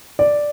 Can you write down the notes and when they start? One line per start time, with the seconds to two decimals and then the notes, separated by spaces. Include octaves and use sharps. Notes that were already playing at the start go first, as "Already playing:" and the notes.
0.19 D5